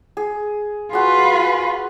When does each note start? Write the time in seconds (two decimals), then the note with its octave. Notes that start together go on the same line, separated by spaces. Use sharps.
0.17 G#4
0.93 F4 F#4 G#4 B4